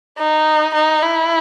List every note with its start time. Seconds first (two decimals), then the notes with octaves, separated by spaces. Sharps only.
0.18 D#4
0.74 D#4
1.02 E4